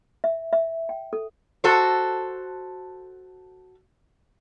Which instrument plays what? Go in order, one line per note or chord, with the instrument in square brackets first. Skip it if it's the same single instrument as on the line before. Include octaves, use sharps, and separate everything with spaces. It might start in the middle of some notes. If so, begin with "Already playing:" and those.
[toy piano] E5
E5
G5
A4
[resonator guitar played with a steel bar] F#4 A4 C5